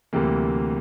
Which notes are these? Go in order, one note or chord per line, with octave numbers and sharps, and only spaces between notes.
D2 C3 E3 G3 A#3